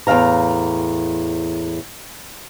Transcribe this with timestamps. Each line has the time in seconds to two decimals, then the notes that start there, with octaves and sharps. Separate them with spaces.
0.07 E2 A2 G#3 F5 A#5